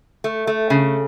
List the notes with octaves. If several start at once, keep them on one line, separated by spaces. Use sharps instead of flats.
A3
A3
C#3